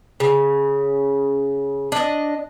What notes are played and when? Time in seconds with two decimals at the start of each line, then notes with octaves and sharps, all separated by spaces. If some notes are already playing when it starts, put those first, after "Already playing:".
0.20 C#3
1.92 D4 D#5